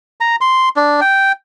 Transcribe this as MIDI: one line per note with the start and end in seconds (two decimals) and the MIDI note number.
0.21 0.36 82
0.41 0.69 84
0.76 1.00 62
1.01 1.32 79